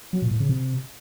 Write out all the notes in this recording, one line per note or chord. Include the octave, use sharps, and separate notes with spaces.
F#3
A#2
A2
C#3
C3